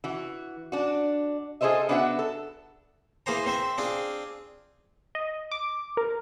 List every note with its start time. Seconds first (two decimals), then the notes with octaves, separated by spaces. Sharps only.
0.04 E3 F#4
0.72 D4 F#4
1.61 F4 G#4 A4 C5 D#5 E5
1.89 B3 D4 F#4 B4 E5 F#5
2.19 A4
3.26 E3 A#3 G#4 C5 A#5
3.46 C4 C5 E5
3.78 C4 D4 F4 G#4
5.15 D#5
5.52 D6
5.97 A#4